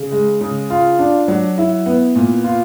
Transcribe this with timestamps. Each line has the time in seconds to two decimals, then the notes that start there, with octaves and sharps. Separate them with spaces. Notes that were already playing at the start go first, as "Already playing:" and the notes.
Already playing: C#3
0.11 G#3
0.41 C#3
0.70 F4
0.99 D4
1.28 F#3
1.58 E4
1.86 B3
2.15 A#2
2.44 F4